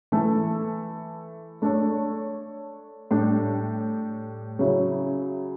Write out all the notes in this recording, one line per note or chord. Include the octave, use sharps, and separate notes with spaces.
E3 A3 E4 A4
A3 D4 A4 C#5
A2 G3 D4
C#3 F#3 C#4 E4